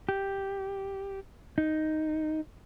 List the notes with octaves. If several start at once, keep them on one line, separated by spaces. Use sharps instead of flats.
G4
D#4